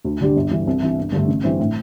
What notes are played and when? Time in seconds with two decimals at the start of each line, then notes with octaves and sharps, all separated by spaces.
0.05 D2
0.21 D3 G3 D4 G4
0.36 G1
0.51 G2 E3 G3
0.67 C2
0.82 C3 E3
0.98 G1
1.12 G2 D3 A3 D4
1.28 A1
1.44 G2 E3 C4
1.60 A2